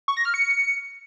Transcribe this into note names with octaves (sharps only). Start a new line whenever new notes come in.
C#6
A#6
F6
C#7